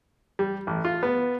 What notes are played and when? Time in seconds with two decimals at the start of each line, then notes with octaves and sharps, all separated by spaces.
0.39 G3
0.67 A1
0.85 F4
1.03 B3